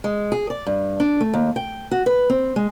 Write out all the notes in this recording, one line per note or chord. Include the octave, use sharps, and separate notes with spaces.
G#3
G#4
D5
G2
D4
A3
D#2
G5
F#4
B4
C4
G#3